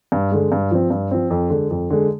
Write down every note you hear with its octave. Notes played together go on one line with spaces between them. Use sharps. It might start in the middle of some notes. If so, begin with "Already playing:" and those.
G2
D3 G#3
G2
F3 C4
G2
F3 C4
F2
D3 G#3
F2
D3 G#3